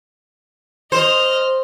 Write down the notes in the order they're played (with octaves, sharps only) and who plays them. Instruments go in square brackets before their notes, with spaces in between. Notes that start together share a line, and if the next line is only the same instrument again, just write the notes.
[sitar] C5 [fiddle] D#5 F6